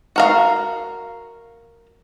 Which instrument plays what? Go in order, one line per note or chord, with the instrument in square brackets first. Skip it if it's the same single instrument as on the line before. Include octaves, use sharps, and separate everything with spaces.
[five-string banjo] F#4 A#4 F5